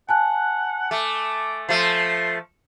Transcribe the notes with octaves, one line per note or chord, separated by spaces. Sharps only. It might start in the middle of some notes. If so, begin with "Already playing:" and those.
F#5 G#5 A5 F#6
A3 D6
F3 A3 C6